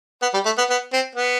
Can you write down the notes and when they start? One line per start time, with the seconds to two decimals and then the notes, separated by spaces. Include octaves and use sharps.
0.22 B3
0.34 G3
0.45 A3
0.58 B3
0.70 B3
0.93 C4
1.15 B3